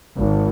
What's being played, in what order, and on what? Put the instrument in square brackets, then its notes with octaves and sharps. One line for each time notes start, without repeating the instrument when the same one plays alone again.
[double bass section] G#1